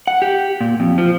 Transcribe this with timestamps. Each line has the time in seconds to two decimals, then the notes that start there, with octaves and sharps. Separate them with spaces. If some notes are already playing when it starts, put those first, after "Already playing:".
0.07 F#5
0.22 G4
0.61 A#2
0.80 F2
0.98 F3